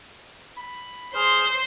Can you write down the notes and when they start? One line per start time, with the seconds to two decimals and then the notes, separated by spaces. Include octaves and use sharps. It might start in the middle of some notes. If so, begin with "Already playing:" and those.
0.57 B5
1.15 G#4 C5 C6 F6